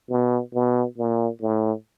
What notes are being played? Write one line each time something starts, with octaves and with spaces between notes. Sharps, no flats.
B2
B2
A#2
A2